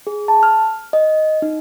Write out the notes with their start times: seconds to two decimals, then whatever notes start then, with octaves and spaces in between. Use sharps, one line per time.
0.07 G#4
0.28 A5
0.43 F6
0.93 D#5
1.42 D#4